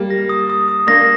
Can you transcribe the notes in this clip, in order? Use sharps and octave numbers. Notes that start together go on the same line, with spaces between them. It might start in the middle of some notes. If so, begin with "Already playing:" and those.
Already playing: G3 A#3
A#6
D#6
D#6
D#6
A#3 D4 A#6